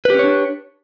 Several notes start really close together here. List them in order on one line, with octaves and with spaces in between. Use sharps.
B4 G4 C#4 C#5 D4